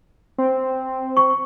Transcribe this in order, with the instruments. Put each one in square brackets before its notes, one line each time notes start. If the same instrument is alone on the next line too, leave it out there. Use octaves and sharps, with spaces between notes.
[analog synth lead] C4
[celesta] C#6